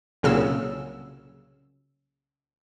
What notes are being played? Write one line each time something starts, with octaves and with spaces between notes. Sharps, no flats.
C2 A#2 C#3 F#3 E6